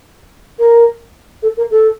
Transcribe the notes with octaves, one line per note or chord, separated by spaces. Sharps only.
A#4
A4
A#4
A4